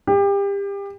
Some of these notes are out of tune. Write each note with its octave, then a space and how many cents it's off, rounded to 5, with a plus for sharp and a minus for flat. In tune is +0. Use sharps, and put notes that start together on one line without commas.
G4 +30